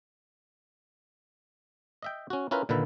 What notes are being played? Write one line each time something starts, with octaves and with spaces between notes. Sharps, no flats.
D#5 E5 G5
C#4 F#4
C#4 E4 F4 A#4 B4
A#2 D3 D#3 B4 E5